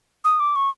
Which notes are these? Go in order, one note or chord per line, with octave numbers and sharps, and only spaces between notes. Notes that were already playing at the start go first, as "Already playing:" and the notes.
D#6
D6
C#6